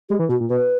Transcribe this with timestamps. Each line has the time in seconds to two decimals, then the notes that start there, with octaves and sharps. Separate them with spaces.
0.09 G#3 G4
0.19 E3
0.29 B2 F#4
0.40 A#2
0.50 B2 B4